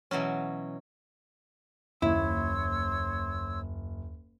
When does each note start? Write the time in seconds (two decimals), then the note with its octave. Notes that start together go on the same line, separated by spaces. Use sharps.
0.11 B2 E3 F#3 C#4
2.02 F#1 D#2 E4 C#5 C6 E6